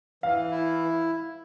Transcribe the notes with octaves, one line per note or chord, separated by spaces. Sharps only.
E3 F5
E4